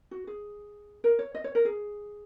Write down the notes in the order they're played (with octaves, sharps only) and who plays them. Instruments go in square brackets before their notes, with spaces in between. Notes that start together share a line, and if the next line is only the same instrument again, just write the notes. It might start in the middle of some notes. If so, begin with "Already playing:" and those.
[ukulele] F#4
G#4
A#4
C#5
D#5
C#5
A#4
G#4